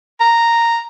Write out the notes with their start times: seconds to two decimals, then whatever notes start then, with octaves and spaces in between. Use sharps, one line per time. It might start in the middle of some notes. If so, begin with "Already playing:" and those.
0.20 A#5